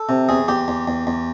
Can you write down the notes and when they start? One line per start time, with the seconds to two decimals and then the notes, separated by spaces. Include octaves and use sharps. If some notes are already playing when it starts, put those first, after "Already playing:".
Already playing: A4
0.09 C3
0.29 E2 G#4
0.48 E2 G4
0.68 E2
0.87 E2
1.07 E2